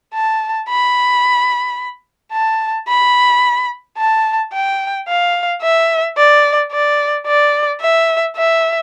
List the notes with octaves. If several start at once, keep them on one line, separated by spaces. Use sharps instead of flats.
A5
B5
A5
B5
A5
G5
F5
E5
D5
D5
D5
E5
E5